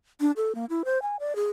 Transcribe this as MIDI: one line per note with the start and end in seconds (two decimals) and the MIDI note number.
0.21 0.31 62
0.37 0.55 69
0.55 0.65 58
0.70 0.83 64
0.85 1.01 72
1.02 1.16 80
1.20 1.36 74
1.36 1.49 68